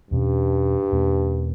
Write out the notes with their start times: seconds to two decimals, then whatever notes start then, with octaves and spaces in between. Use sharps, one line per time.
0.11 E2 G2 B2 A#3 C#4
0.92 E2 B2 A#3 C#4